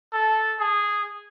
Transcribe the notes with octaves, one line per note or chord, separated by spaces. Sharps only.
A4
G#4